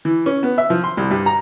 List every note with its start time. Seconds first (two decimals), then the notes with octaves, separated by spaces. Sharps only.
0.05 E3
0.26 C#4
0.43 B3
0.58 E5
0.70 F3
0.84 C6
0.97 C2
1.11 G2
1.26 A#5